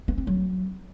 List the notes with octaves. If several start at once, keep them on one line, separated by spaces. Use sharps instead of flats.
B3
C4
F#3